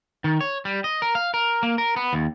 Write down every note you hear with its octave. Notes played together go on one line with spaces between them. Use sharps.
D#3
C#5
G3
D#5
A#4
F5
A#4
A#3
A#4
B3
D#2